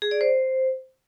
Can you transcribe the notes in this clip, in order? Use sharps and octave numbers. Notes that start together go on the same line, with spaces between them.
G#4
D5
C5